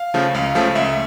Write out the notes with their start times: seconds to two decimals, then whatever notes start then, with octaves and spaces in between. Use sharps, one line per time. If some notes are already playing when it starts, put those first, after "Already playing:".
Already playing: F5
0.14 C#3 F3 A3
0.34 C#2 F5
0.55 C#3 F3 A3
0.75 C#2 E5